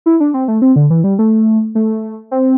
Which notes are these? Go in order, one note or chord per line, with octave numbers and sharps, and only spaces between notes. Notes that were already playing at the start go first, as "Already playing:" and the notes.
E4
D4
C4
A3
C4
D3
E3
G3
A3
A3
C4